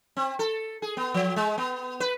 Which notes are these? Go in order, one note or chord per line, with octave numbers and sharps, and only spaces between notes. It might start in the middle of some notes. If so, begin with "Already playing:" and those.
C4
A4
G#4
B3
F3
G#3
B3
B4